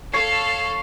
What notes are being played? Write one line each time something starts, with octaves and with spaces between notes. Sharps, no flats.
A4 C#5 F5 C7